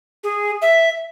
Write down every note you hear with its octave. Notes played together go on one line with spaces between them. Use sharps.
G#4
E5